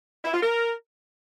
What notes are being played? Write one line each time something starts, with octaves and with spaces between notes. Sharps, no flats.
E4
F4
A#4